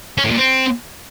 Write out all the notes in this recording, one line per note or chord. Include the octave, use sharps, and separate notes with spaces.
C#4
A2
A#2
C4